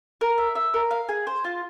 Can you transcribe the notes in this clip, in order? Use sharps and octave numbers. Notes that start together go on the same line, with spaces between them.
A#4
E5
E5
A#4
F5
G#4
C5
F4